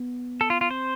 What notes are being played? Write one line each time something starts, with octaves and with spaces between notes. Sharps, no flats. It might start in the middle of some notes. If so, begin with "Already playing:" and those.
Already playing: B3
A4
F4
F4
C4 C5